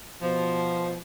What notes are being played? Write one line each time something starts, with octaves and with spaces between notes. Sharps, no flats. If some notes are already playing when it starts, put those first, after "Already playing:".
B2 F3